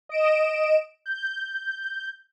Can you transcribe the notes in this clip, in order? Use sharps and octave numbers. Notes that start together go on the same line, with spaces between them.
D#5 D7 E7
G6